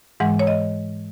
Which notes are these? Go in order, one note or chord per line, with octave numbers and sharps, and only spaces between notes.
G#2 E3 G#3 F#5
C#5
D#5